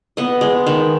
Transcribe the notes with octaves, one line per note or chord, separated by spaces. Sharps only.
B3 D#5
G#3
D#3